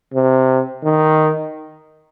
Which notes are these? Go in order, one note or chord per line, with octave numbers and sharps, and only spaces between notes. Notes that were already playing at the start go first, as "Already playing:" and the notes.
C3
D#3